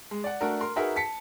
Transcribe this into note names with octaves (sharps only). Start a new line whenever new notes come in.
G#3
D5 F#5
A3 D4 F#4 A4 A#4
A#4 C6
D#4 F#4 G#4 A#4 B4 E5
A5 B6 C#7